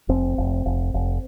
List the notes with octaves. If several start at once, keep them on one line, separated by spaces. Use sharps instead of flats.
F1 C4
F1
F1
F1